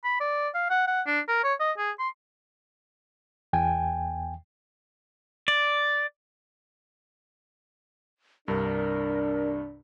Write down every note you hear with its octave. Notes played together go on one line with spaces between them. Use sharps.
B5
D5
F5
F#5
F#5
D4
A#4
C#5
D#5
G#4
C6
E2 G5 G#5
D5
C2 G2 D4 A#4